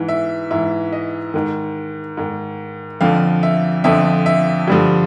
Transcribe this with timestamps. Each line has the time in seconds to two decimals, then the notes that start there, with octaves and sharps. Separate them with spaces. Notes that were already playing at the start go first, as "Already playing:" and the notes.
Already playing: G#2 E3
0.09 E5
0.51 G#2 E3 E5
0.93 D#5
1.34 G#2 D#3
2.17 G#2 D#3
3.01 F2 D3 F3 F5
3.43 E5
3.84 F2 D3 F3 E5
4.26 E5
4.68 G2 D3 F3